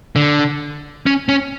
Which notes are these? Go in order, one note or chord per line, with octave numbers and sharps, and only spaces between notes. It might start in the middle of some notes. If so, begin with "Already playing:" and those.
D3
C#4
C#4